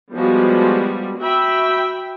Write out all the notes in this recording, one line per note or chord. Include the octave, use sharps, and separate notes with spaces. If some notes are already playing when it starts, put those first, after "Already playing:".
F3 G3 G#3 B3 F#4
F#4 E5 G5 B5